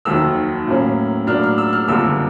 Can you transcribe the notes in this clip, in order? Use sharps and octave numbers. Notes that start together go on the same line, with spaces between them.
F1 D#2 D#3 F#3 E6
A2 F#3 A#3 C#4
A2 F#3 A#3 D4 F6
F6
E6
F6
F#1 F2 D3 G3 A#3 E6